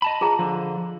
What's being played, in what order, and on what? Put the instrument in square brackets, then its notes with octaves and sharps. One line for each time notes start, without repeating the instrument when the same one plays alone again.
[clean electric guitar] D#5 A5 B5
[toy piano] F4 G#4 A#5
[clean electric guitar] D3 F3